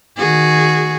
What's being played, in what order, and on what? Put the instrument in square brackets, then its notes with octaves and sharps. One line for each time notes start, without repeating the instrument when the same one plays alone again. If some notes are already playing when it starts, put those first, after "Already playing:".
[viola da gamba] D#3 F#4 G#4